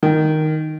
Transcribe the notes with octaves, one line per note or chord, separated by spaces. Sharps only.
D#3